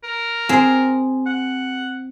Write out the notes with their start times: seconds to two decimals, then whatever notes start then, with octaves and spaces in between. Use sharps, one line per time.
0.04 A#4
0.49 C4 G#4
1.26 F#5